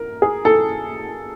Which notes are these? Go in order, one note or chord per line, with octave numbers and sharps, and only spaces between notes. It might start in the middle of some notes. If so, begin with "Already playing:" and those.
Already playing: A#4
G#4
A4